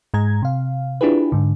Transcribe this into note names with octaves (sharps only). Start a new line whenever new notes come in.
G#2 G#3 A#5 G#6
C3 F5
D4 E4 F4 G4 G#4 B4
G#2 D3